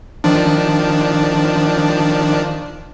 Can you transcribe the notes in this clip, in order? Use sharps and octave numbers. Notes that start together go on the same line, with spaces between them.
D#3 F3 D4